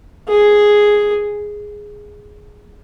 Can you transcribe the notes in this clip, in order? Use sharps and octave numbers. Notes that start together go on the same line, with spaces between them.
G#4